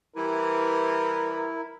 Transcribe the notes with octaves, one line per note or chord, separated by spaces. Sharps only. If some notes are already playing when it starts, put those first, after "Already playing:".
E3 G3 E4 A#4